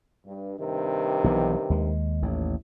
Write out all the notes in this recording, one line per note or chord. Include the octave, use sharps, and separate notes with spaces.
G2
G2 C3 D#3
B1 E3 B3
D#2 G#3
A1 D#2 A2